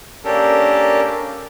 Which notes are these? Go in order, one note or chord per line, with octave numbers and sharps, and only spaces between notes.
A#3 C#4 D4 G4 A4 A#4